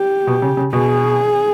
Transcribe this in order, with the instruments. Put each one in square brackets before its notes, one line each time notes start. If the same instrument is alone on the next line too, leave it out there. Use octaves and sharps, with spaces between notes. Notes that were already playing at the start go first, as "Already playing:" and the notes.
Already playing: [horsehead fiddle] G4
[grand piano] B2
C#3
C#3
[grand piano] B2 [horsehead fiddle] G#4